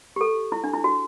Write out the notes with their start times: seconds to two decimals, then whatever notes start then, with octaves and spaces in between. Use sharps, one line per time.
0.16 G4
0.21 A4
0.52 E4
0.64 D4
0.74 E4
0.84 F#4